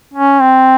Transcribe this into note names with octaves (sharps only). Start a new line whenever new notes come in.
C#4
C4